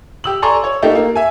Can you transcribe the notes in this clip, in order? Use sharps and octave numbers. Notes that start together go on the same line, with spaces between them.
G4 E6 F#7
A4 D5 G#5 A#5 C6 C#6
C#5
A3 A#3 D#4 G4 A4
A#3
E5 G#5